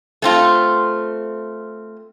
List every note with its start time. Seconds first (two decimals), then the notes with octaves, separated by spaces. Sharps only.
0.22 A3 C4 F4